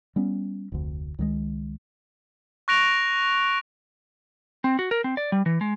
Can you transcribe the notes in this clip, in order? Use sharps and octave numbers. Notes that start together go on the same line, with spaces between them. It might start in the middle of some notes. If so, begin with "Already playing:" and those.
G3 B3 C#4
F1 D2
C#2 D#3 F#3 G#3
C#6 F#6 A#6 D7 F7
C4
F#4
A#4
C4
D5
G3
E3
G#3